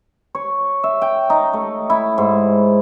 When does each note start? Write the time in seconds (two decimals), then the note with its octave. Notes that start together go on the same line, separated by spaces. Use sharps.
0.35 C#5
0.84 E5
1.02 G5
1.30 D#4
1.53 A3
1.90 E4
2.18 G#2